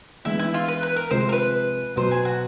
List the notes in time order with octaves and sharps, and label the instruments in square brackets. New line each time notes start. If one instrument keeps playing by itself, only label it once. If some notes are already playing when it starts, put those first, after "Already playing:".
[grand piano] E3 G#3 B3 D4 [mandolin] E4
[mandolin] E4
F4
B4
B4
A#4
[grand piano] C3 F3 G#3 [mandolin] C5
[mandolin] A#4
B4
[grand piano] B2 F#3 B3 [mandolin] C5
[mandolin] G#4
F#4